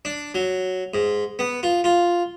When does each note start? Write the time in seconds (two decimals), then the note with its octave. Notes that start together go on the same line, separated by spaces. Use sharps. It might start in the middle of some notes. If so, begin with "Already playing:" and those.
0.05 D4
0.34 F#3
0.94 G#2
1.39 B3
1.63 F4
1.84 F4